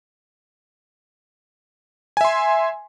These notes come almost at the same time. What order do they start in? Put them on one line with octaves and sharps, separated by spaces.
G#5 E5 C6